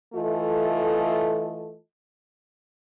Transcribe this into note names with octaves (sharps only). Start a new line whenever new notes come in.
E3 A3 F4 A4 D#5